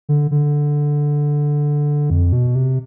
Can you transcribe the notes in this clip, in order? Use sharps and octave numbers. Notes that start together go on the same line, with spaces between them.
D3
D3
F2
B2
C3